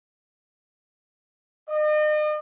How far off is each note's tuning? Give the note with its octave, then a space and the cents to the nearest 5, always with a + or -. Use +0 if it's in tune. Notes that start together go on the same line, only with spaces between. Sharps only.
D#5 -40